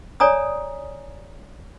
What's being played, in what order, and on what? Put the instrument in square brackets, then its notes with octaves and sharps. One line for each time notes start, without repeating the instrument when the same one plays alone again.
[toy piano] C#5 D5 G#5 A#5 D#6